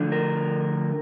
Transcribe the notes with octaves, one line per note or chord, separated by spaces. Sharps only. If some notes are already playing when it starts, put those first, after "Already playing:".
Already playing: D3 F3 A3 D4
A#4